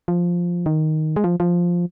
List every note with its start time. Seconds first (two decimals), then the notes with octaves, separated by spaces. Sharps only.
0.08 F3
0.66 D#3
1.16 G#3
1.24 F3
1.40 F3